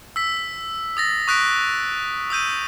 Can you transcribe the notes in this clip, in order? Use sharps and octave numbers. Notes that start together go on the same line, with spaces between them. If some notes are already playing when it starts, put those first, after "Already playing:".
E6 B6
D#6 A6 A#6
C#6 D#6 F#6 A#6 B6 D7
D#6 E6 G6 D#7